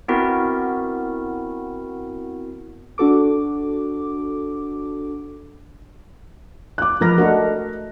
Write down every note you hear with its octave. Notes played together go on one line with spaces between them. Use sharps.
B3 C4 E4 F#4 A#4
D4 F#4 A4 D6
D6 F#6
F3 G#3 A#4 B4 A#6
A3 D4 F#4 A#4 D#5